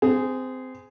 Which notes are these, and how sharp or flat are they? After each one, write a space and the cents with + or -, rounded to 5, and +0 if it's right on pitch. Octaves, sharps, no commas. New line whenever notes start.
C4 -25 G#4 +0